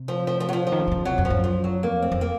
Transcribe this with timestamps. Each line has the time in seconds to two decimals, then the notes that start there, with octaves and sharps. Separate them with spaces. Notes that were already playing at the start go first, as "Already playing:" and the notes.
Already playing: C3
0.08 F3
0.27 F3
0.40 F3
0.49 F#3
0.53 F3
0.67 F3
0.72 D#3
0.80 C#3
0.87 C3
0.91 C#3
1.05 C3 F#3
1.18 F2
1.25 F3
1.30 F#2
1.44 F3
1.64 F#3
1.83 F2 A#3
2.02 C4
2.12 F2
2.21 A#3